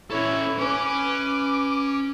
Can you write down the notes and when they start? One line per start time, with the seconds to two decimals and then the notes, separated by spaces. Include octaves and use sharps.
0.10 C#4 E4 A4 C#5
0.59 C#4 B4 G#5 D6